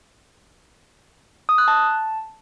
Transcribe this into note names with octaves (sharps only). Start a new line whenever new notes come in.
D#6
F#6
A5